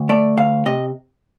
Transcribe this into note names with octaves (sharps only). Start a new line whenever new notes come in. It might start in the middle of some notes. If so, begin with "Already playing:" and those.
Already playing: D2
A3 D5
D2 F5
C3 D#5